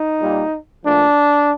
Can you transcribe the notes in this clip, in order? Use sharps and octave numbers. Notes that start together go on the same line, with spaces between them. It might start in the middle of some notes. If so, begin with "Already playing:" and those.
Already playing: D#4
A#2 G3 A#3
A#2 F3 A3 D4